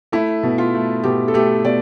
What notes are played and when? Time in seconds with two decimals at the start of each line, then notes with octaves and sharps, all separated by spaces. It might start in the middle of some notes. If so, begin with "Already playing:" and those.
0.12 A3 E4
0.43 B2
0.58 F4
0.74 A3
1.03 B2 G4
1.28 A4
1.34 A3 G4
1.64 B2 D5